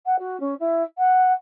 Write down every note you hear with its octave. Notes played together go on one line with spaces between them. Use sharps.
F#5
F#4
C#4
E4
F#5